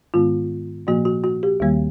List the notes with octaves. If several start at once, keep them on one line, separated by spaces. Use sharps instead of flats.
G#2 D#3 G#3 B3 F4
A#2 F3 A#3 F#4
F#4
F#4
G4
D#2 D#3 G3 A#3